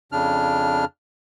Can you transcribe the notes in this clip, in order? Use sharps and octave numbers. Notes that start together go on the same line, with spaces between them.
F2 C#3 D4 F6